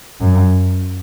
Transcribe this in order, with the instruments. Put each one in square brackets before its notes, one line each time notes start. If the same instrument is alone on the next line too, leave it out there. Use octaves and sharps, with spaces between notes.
[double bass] F#2